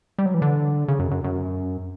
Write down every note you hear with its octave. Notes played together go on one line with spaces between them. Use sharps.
G3
F#3
E3
D3
C#3
F#2
F#2
F#2